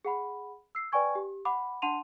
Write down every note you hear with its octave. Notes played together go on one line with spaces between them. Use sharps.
G#4 F#5 B5
E6 C7
B4 D5 G5 G#5 C#6 G#6
G4
F#5 B5 D6
D4 F#5 A5 C6 D#7 F7